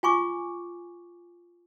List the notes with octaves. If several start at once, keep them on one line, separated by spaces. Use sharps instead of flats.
F4 G#5 C#6 D6